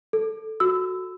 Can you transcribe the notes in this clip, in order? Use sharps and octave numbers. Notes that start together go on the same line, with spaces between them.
A4
F#4 E6